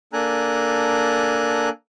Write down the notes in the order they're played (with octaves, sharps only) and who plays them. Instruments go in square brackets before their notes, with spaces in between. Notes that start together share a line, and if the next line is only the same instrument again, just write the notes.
[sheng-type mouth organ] A#3 D4 A4 G#5 A#5 F#6